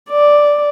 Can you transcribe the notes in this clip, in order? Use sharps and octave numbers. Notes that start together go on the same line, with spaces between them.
D5